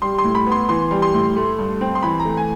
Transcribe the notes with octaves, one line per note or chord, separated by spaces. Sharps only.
G3 C6
C6
A2
B5
B3
C6
E3 C6
G3
C6
A2
A3
G2
C4
C6
E3 B5
A#5
A3
G#5